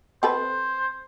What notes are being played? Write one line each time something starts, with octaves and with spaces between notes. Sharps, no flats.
C4 A4 B4 C5